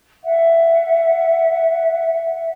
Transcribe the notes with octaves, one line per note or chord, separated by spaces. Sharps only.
E5 F#5